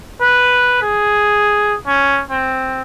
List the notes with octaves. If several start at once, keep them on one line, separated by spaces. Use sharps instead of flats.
B4
G#4
C#4
C4